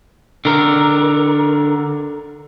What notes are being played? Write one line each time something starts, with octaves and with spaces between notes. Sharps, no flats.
D3 A#4